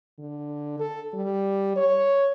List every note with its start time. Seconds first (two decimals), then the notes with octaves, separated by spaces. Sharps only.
0.19 D3
0.80 A4
1.14 G3
1.76 C#5